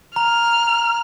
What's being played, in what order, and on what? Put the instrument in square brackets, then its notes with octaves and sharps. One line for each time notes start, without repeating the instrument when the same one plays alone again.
[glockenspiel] A#5 [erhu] F6